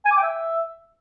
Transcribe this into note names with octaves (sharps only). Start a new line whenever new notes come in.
G#5
D6
G5
E5